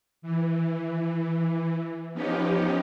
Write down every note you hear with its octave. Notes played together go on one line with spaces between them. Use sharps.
E3
F3 B3 C#4 D#4 G4